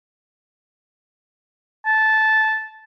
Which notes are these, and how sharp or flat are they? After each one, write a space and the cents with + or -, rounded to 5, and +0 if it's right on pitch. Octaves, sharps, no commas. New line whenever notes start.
A5 -10